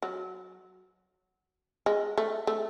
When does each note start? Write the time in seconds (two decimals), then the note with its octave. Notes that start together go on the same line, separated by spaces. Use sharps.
0.02 F#3
1.86 G#3
2.17 A3
2.47 A3